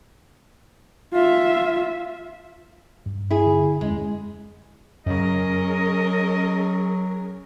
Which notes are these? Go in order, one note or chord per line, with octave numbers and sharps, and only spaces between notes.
F4 E5
G2
E4 G#4
D3
E1 F2 G#3 C#4
F#2 C#3 F#3 C#4 G#4 A#4 D#5